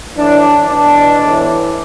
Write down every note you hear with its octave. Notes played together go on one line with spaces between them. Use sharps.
A2 E3 D4
E2 B2 D4
A2 E3